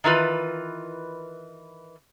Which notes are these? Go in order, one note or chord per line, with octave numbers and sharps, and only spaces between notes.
D#3 E3 F4 B4